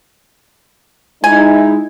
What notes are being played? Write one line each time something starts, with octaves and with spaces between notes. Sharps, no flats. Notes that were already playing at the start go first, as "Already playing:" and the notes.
G#3 D#4 E4 G#5